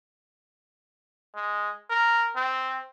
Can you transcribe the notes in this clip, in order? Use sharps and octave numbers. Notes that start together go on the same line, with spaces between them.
G#3
A#4
C4